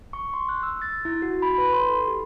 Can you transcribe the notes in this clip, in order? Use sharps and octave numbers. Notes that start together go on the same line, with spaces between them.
C#6
C6
F#6
E6
A6
E4
F#4
B5
B4
C6
A4
G4